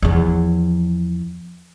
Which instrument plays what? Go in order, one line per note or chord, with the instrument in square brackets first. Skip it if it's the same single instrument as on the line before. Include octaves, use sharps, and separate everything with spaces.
[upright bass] E2 F3